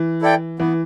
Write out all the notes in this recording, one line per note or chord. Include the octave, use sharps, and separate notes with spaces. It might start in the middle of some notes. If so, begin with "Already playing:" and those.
Already playing: E3
E4 A4 D5 G5
E3 B3